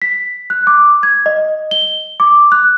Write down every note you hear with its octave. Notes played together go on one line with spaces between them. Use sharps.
B6
F#6
D6
G#6
D#5
G7
D6
F#6